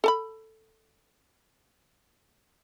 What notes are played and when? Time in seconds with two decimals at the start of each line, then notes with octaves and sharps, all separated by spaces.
0.04 A4 A5 B5